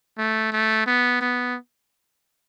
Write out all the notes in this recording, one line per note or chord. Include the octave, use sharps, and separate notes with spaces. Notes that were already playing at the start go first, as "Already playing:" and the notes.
A3
A3
B3
B3